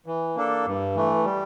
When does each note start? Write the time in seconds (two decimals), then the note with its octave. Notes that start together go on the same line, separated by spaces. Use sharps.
0.06 E3
0.36 A#3 D4 A4
0.66 G2
0.96 E3 A3
1.25 G3